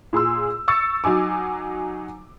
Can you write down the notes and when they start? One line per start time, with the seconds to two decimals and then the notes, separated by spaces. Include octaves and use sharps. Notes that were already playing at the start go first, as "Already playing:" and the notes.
0.13 A#2 G#4 C6 E6
0.68 C#6 E6 A6 C#7
1.04 F#3 D#4 G#5 D6